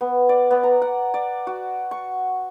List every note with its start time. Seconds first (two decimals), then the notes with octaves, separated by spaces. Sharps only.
0.01 B3
0.29 D5
0.51 B3
0.63 A#5
0.82 F#5
1.14 D5
1.47 F#4
1.91 C#6